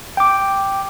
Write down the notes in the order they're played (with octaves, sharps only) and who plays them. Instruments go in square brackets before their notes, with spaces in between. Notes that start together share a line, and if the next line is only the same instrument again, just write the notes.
[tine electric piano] G5 D6